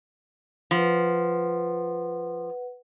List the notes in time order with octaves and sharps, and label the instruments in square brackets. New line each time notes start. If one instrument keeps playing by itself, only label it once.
[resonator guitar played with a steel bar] F3 [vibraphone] B4 F#5